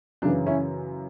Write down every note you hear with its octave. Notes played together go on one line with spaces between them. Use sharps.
F#2 C#3 E3 D4
C#4 E4